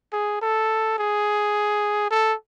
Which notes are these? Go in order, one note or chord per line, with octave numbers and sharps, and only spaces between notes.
G#4
A4
G#4
A4